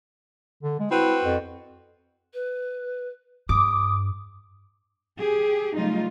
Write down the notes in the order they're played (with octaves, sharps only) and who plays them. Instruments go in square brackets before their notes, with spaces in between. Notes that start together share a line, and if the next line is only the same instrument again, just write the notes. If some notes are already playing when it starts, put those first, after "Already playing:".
[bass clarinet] D3
G#3
[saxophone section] C4 F#4 B4 [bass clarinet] E4
[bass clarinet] F2
[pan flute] B4
[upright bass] G2 [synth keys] D6 [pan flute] D#6
[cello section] G4 G#4
C#3 F#3 G3 A3 D#4 F4